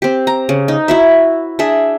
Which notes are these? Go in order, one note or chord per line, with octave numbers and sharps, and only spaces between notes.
C4 G4
A#5
C#3
D#4
E4 F#4 E5
D4 G#4 E5